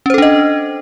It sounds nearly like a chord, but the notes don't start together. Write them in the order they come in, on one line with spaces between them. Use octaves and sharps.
C#4 C5 A4 D4 D#5